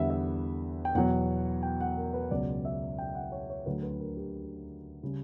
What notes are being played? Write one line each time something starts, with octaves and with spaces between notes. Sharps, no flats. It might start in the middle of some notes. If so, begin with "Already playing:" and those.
Already playing: E2 D3 G3 E5 F#5
E5
G5
E2 B2 F#3 F#5
G5
F#5
A#4
B4
C#2 B2 F#3 D5
E5
G5
F#5
C#5
C#5
D2 D3 F#3 B4
B4
A#4
G4
C#3 G3